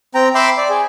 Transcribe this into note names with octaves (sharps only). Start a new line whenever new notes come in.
C4 G5 A#5
E5 G5 B5 C6 D6 E6
D5
G#4